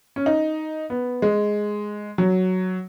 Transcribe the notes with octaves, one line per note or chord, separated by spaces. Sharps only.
C#4
D#4
B3
G#3
F#3